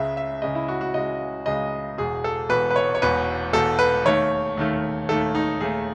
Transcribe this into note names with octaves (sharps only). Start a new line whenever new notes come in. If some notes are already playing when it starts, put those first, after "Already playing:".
Already playing: C#2 C#3 G#3 E5
E5
C#2 C#3 G#3 D#5
E4
F#4
F#4
C#2 C#3 G#3 D#5
C#2 C#3 G#3 D#5
E1 E2 B2 G#4
A4
E1 E2 B2 B4
B4
C#5
C#5
E1 E2 B2 B4
E1 E2 B2 A4
B4
D#2 D#3 A3 C#5
D#2 D#3 A3
D#2 D#3 A3 A4
D#4
D#2 D#3 A3 G#4